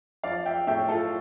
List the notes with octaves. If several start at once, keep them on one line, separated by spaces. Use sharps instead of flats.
F3 D5 F5
E5 G5
A2 E5 G5
F4 A4